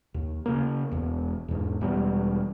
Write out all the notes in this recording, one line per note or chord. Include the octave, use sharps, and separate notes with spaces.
D#2
C#3 A#3
E1 E2
E2 G#2
E1 E2 G3